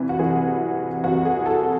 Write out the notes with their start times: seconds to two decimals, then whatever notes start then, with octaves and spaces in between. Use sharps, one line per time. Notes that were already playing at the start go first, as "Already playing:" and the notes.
Already playing: C2 C3 E3
0.09 F#4
0.19 C2 C3 E3 G#4
1.04 C2 C3 E3 F#4
1.25 G#4
1.46 A4